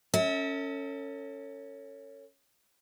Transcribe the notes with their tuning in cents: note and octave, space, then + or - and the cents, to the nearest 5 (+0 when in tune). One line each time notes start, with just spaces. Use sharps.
C#4 +0 A4 +40 E5 -35